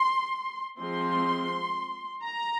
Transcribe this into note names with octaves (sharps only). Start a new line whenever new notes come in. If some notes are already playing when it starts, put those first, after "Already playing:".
Already playing: C6
F3 G#3 C4 C6
A#5